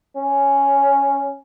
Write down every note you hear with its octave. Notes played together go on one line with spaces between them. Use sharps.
C#4